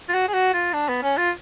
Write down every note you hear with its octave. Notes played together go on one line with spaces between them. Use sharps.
F4
F#4
G#4
F#4
F4
D4
B3
C#4
F4